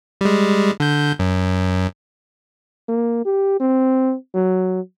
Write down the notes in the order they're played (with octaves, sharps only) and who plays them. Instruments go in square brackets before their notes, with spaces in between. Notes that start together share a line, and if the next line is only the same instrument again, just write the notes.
[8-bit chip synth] G3 G#3
D3 G6
F#2
[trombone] A#3
G4
C4
F#3